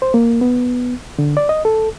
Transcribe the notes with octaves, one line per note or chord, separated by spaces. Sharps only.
C5
A#3
B3
D3
D5
D#5
A4